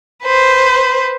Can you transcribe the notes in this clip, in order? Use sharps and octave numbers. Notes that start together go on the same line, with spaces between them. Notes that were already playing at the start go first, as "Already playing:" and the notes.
B4 C5